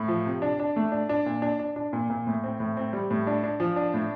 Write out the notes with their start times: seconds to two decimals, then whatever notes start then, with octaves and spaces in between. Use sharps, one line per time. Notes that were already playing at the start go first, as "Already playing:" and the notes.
Already playing: A2
0.08 F3
0.26 C3
0.42 D4
0.60 D4
0.76 A3
0.92 D4
1.09 D4
1.26 A#2
1.42 D4
1.59 D4
1.76 D4
1.93 A#2
2.10 A#2
2.27 A2
2.44 C4
2.60 A2
2.77 C4
2.93 G3
3.11 A2
3.27 D4
3.44 D4
3.60 F3
3.76 D4
3.94 A2